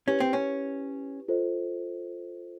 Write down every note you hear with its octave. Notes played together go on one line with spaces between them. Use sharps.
C#4 E4 G4 B4
C4
C#4
F4 A4 C5 D#5